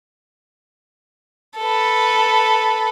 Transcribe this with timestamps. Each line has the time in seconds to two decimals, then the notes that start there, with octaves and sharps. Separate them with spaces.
1.60 A4 B4